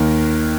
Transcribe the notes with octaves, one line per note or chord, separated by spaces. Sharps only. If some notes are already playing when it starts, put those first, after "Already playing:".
Already playing: D#2 D#3 A#3 A#4